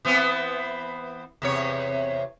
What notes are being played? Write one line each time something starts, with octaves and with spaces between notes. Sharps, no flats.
E3 B3 C4
E2 C3 C#5